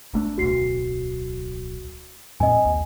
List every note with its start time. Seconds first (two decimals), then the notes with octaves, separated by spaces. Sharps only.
0.14 G#1 A3 D4
0.38 D1 B1 F#4 C7
2.40 G2 A#2 C4 D#5 G#5
2.65 A#1 D#2